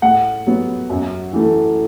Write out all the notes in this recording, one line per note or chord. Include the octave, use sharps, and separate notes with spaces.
A2 F#5
F#3 B3
F#2
E3 A3